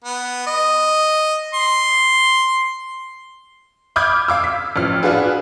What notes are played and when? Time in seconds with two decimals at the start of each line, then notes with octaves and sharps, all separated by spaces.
0.05 B3
0.46 D#5
1.54 C6
3.96 B5 D6 D#6 F6 G6 G#6
4.28 F5 D6 E6
4.44 B6
4.76 A1 F3 F6
5.03 D4 F4 F#4 G#4 B4